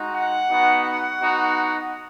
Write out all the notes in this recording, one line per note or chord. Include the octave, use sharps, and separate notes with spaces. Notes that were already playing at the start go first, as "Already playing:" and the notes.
Already playing: G#3 D#4 F#4
F#5
B3 D#4 F#4
F#5
B3 D#4 F#4